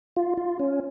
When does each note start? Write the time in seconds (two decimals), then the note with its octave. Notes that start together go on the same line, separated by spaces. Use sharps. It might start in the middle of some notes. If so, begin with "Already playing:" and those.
0.16 F4
0.37 F4
0.60 C#4